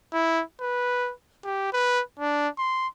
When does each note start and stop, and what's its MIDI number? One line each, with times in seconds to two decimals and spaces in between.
0.13 0.42 64
0.61 1.12 71
1.44 1.71 67
1.73 2.01 71
2.19 2.48 62
2.58 2.88 84